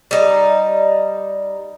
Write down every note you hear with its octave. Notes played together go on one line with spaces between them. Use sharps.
G3 D#4